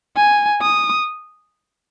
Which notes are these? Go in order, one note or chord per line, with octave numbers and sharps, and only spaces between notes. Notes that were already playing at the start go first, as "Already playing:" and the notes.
G#5
D#6